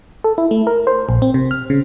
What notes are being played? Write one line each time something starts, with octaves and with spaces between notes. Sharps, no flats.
A4
E4
A3
A#4
C5
A#1
C4
C3
F6
C#3